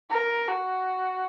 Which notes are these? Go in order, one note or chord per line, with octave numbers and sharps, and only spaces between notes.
A#4
F#4